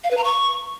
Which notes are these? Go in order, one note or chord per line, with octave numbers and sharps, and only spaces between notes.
F5
B4
A#5
C#6